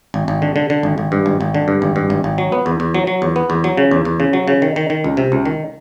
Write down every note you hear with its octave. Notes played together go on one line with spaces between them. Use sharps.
G#1
G#1
D3
D3
D3
G#1
G#1
G2
G#1
G#1
D3
G2
G#1
G2
G#1
G#1
F#3
B3
E2
E2
F#3
F#3
E2
B3
E2
F#3
C#3
E2
E2
C#3
F#3
C#3
D#3
D#3
D#3
C#2
C3
C#2
D#3